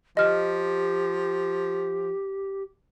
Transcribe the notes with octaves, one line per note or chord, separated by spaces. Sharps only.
F3 G4 D#5 F6